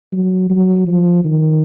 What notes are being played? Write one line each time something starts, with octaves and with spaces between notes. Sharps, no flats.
F#3
F#3
F3
D#3